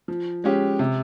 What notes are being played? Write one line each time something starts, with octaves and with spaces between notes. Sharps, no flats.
F3
G#3 C#4 G4
C3